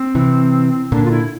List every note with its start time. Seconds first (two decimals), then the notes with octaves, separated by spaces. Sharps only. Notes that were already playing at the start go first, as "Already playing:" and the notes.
Already playing: C4
0.15 C3 E3
0.91 A#2 D3 D4
1.05 F4
1.11 E4